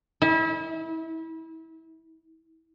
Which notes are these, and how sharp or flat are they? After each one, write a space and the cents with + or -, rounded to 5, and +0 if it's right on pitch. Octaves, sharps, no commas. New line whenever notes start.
E4 -30